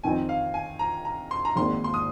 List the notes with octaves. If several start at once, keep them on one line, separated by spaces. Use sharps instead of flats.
F2 D#3 C4 D#4 G#5
F5
G#5
A#5
A#5
C6
A#5
G#1 G#2 D#3 A#3 C6
C6
D#6